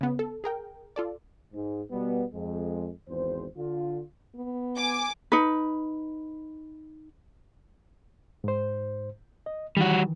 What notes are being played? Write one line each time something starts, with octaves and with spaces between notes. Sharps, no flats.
C#3 B3
A4
G#4 A#4 G5
F4 A4 D5
G#2
B2 G3 B3
F2 G#3
G#1 E2 C5
D3 F4
B3
G#5 D6
D#4 B4
G#2 C5
D#5
D#3 E3 G3 F#4